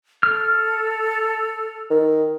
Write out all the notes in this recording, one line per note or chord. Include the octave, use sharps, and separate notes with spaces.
A4 F6
D#3